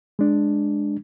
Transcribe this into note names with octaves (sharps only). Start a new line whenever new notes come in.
G#3 D4